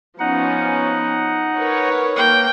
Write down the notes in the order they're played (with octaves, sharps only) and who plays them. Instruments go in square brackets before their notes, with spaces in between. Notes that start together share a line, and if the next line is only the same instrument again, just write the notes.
[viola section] F3 B3 C#4 [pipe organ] D#4 F#5
[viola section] A#4 B4 C#5
[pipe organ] A#3 [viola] G5